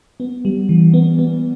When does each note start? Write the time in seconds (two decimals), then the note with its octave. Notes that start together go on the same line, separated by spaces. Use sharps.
0.20 B3
0.45 G3
0.69 E3
0.94 B3
1.19 B3